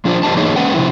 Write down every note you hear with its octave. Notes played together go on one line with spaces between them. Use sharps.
F3 D4 F4 C5 D5
G2 E3 G4 C5 D#5 A5
E3 A#3 D#4 G#4 C#5 D#5
G#3 C#4 B4 F#5 G5
C3 F3 E4